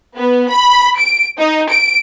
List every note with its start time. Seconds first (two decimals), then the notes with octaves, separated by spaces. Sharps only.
0.17 B3
0.51 B5
0.99 D7
1.39 D#4
1.70 D7